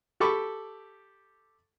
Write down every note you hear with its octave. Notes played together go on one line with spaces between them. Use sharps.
G4 A4 B5 C#6 D6